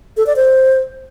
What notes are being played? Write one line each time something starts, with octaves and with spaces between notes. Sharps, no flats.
A4
D5
C5